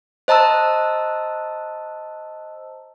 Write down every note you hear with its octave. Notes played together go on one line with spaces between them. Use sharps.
C5 D#5 A5 A#5 E6